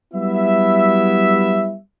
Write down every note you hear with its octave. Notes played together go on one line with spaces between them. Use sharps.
F#3 G3 B3 E4 E5